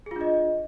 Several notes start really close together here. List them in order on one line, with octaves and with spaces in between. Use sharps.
G#4 F4 D4 D#5